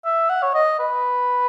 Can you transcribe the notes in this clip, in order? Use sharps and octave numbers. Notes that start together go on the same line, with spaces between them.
E5
F#5
C#5
D#5
B4